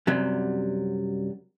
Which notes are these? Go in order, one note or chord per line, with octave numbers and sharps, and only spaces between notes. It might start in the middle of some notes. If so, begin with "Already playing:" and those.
F#2 C3 F#3 G3